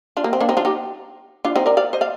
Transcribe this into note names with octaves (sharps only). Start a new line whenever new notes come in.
D4 F4
A#3
C4
A#3 D4
C4 D#4
D4 F4
D#4 G4
D4 F4
C4 D#4
A#4 D5
D5 F5
C5 D#5
D5 F5